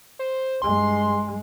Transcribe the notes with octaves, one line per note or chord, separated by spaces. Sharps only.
C5
G2 G#3 C6